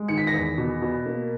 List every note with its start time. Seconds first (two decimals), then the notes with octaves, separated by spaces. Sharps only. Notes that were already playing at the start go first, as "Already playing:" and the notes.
Already playing: G#3
0.08 D#3 C#7
0.18 B6
0.27 A#6
0.33 E2 B6
0.58 B2
0.82 B2
1.06 A#3